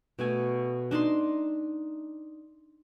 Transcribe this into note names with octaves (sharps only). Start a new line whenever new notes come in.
B2 A3 G#5
D4 D#4 A5 C6